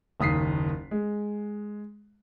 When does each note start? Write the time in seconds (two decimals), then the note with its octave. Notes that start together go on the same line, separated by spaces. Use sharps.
0.20 F#1 D#2 D#6 B6 C7
0.91 G#3